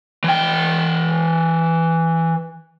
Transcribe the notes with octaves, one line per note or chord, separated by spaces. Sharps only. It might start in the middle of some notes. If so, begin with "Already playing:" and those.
E3 G5